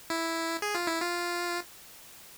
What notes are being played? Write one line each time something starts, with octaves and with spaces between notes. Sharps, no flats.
E4
G#4
F4
E4
F4